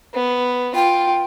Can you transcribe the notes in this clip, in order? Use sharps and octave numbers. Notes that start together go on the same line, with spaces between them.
B3
F4 G5